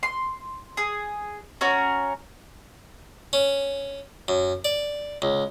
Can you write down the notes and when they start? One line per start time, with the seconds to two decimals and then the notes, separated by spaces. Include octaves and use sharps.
0.03 C6
0.77 G#4
1.61 C#4 F#4 A#4
3.33 C#4
4.28 F#2
4.65 D5
5.22 C#2